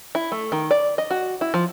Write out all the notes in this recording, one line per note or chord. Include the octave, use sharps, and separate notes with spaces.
E4
A3
D#3
D5
D#5
F#4
E4
F3